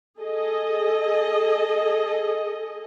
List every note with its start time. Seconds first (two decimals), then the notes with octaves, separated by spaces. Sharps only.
0.18 G#4 A4 D#5